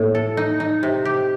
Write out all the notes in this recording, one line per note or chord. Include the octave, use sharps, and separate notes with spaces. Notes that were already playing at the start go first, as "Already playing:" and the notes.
Already playing: A2 A#3
A4
D#4
D#4
C3
G4